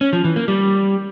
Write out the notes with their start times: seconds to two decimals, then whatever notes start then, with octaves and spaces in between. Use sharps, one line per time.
0.01 C#4
0.13 F3
0.24 E3
0.36 A#3
0.48 G3